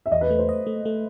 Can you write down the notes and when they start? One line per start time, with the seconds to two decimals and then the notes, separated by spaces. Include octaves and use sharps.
0.06 E5
0.12 E2 D#5
0.21 B4
0.30 A3
0.39 C5
0.49 D#5
0.67 A3
0.85 A3